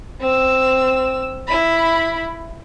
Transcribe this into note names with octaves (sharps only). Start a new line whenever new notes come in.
C4 E6
E4 B5